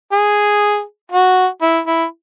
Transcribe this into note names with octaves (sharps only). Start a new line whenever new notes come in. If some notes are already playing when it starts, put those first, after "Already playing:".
G#4
F#4
E4
E4